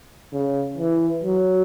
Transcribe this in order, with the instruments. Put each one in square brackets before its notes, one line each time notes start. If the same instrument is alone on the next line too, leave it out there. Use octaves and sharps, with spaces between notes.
[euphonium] C#3
E3
F#3